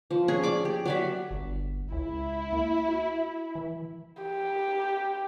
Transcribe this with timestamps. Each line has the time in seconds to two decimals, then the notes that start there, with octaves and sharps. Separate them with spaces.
0.10 F3
0.28 C#4 G#4
0.43 D5 D6
0.65 G4
0.85 F#3 D5 E5
1.31 G1
1.92 C#2 E4
2.53 A#3
2.88 F#4
3.55 E3
4.22 G4